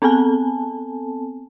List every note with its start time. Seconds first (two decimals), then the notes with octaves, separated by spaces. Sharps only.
0.02 B3 C4 A4 G#5 A5